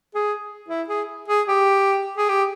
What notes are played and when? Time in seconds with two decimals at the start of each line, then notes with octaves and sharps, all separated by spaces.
0.15 G#4
0.68 E4
0.88 G#4
1.28 G#4
1.48 G4
2.17 G#4
2.29 G4